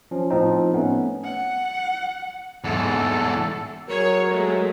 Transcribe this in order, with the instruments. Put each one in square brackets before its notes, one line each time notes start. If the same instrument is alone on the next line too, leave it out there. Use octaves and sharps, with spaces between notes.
[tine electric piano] F3 C#4
A2 F3 C4 D#4
A3 B3 C#4
[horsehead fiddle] F#5
[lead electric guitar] E2 G#2 [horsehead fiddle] A4
[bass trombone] F#3 [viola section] G#4 C#5 [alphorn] A#4
[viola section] G#3 A3